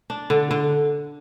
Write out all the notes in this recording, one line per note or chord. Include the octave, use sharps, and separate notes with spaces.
D4
D3
D3